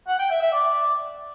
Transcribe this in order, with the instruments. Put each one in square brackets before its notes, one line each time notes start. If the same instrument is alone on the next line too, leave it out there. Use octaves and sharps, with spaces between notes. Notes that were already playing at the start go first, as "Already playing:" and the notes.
[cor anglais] F#5
G5
E5
E5
D5